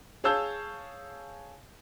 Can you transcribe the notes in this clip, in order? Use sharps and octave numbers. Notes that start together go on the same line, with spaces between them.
G#4 C#5 F5 A5 E6 G6